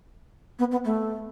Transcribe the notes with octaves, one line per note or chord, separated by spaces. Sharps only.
B3
B3
A3